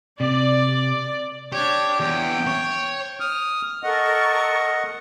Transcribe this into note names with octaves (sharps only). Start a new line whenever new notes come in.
C3 D5
D4 G4 C#5
E2 G5
C#5
D#6 F6
A4 A#4 D#5 F#5 C#6